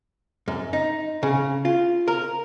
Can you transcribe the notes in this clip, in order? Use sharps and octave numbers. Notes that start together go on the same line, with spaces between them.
F#2
D#4
C#3
F4
A#4